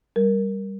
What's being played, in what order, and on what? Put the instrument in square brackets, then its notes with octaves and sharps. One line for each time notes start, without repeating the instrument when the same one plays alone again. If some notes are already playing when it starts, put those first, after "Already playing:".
[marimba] G3 A#4